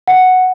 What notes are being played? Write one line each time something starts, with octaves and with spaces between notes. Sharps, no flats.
F#5